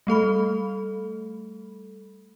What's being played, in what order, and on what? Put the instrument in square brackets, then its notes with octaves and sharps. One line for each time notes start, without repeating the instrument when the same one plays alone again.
[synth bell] G3 A3 A4 B5